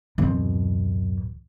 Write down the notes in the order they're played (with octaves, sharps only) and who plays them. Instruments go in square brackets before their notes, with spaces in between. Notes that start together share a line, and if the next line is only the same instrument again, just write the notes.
[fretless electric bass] D1 E3 C4 [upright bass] F#2 B2